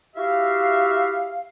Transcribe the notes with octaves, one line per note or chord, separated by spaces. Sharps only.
E4 F#4 G4 E5 F5